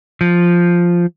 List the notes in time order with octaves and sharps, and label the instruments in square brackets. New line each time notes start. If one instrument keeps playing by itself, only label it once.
[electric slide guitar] F3